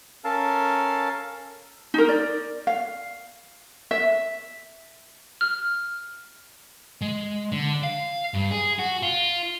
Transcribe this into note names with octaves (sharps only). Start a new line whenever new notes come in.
C#4 A4 A#4 F5 A5
D#4 A#4
D5
F5
E5
F6
G#3
D3
F5
G2
G#4
F#4
F4